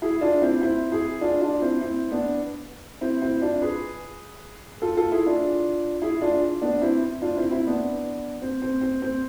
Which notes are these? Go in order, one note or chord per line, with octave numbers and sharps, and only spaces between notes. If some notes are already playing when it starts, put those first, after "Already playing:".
E4 G#4
D4 F4
C4 E4
C4 E4
E4 G#4
D4 F4
D4 F4
C4 E4
C4 E4
B3 D4
C4 E4
C4 E4
D4 F4
G#4 B4
F4 A4
F4 A4
E4 G#4
D4 F4
E4 G#4
D4 F4
B3 D4
C4 E4
D4 F4
C4 E4
C4 E4
B3 D4
C4
C4
C4
C4